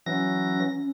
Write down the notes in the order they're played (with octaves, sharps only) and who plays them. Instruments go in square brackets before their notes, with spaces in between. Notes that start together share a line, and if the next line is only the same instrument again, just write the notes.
[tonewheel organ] E3 F#3 A#6 [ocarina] C#4